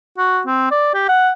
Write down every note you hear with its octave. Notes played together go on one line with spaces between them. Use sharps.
F#4
C4
D5
G4
F#5